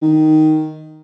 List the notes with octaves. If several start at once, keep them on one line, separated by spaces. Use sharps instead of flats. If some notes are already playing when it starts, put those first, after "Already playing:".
D#3